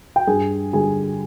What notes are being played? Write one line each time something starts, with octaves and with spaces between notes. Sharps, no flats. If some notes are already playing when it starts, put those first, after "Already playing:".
G5
G2 G#4 G#5
D3 G3 G#4 G#5